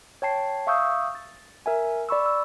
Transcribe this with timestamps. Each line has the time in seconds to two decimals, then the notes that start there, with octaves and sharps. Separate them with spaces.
0.22 C#5 G5 A5 C7
0.67 E5 F5 C#6 D#6 E6 G6
1.15 A6
1.66 A#4 E5 G#5
2.09 D5 B5 C#6 E6
2.26 E6